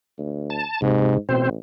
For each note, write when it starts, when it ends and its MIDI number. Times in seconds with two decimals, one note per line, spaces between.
0.18 0.61 38
0.50 0.81 81
0.82 1.16 44
0.82 1.18 48
1.29 1.57 33
1.29 1.50 47
1.29 1.50 60
1.29 1.50 72